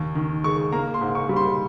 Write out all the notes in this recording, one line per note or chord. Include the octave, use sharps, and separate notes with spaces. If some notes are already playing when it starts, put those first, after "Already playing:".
Already playing: D#2
D#3
G#3 C#6
A#3 A#5
C6
G#2
C#6
G3
C6